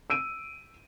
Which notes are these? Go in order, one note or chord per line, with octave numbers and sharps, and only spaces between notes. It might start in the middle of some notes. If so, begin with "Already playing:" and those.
E6 D7 D#7